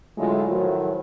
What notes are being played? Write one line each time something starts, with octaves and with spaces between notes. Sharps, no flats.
A2 D3 F#3 G#3 A3 F4
A2 D#3 F3 F#3